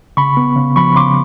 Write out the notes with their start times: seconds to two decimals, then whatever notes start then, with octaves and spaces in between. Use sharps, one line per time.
0.17 C#3 B5 C#6
0.37 B3
0.56 C#3
0.76 F3 B5 C#6
0.96 C#3 C6 D6